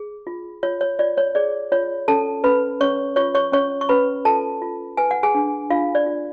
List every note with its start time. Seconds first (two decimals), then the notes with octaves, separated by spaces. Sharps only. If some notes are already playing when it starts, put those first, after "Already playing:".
Already playing: G#4
0.27 F4
0.63 F4 C#5
0.81 C#5
0.99 F4 D5
1.17 C#5
1.35 G#4 D5
1.72 F4 C#5
2.08 C#4 A4 A5
2.44 C#4 B4 B5
2.81 C#4 C#5 C#6
3.16 F4 C#5 C#6
3.35 C#5 C#6
3.52 C#4 C#5 C#6
3.81 C#6
3.89 C#4 B4 B5
4.25 F4 A4 A5
4.62 F4
4.97 B4 G#5
5.11 F#5
5.23 G#4 G#5
5.35 D4
5.70 D4 F4 F5
5.95 D5
6.06 F4